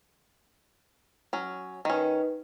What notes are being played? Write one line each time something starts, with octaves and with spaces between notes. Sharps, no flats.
F#3 C#4
D#3 C#4 D#4 B4 D#5